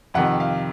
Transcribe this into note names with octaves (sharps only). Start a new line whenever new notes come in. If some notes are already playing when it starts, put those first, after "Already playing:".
F2 C3 D#3 F#5
F5